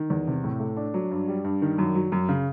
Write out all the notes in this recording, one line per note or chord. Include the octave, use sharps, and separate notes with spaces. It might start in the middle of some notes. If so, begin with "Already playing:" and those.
Already playing: D#3
E2
C3
A2
A3
D4
F#3
G2
G3
G2
D#3
F#2
F#3
F#2
C#3